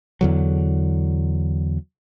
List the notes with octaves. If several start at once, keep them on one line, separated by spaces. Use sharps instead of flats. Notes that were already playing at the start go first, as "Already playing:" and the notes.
E2 D3 F#3